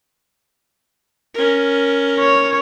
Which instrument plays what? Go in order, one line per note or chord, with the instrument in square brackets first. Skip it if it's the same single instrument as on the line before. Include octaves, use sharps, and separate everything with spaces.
[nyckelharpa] C#4 A#4
[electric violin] C#5